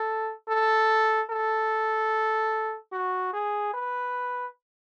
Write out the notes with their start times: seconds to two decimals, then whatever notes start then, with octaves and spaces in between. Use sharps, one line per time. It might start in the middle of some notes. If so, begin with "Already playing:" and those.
Already playing: A4
0.48 A4
1.30 A4
2.93 F#4
3.33 G#4
3.74 B4